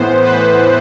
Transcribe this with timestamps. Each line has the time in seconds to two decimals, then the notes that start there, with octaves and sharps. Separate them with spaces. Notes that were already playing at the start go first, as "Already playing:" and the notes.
Already playing: A2 E3 B3 C5
0.23 B4